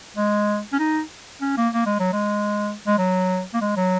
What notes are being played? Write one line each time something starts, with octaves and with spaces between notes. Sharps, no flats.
G#3
C#4
D#4
C#4
A#3
A#3
G#3
F#3
G#3
G#3
F#3
A#3
G#3
F#3